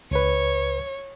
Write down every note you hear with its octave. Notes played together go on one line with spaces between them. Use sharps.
C#2 B4 C#5